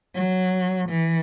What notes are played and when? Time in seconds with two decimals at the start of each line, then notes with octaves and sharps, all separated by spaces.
0.14 F#3
0.88 E3